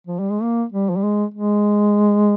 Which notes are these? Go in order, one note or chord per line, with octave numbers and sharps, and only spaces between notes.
F3
G3
G#3
A#3
G3
F3
G3
G#3
G#3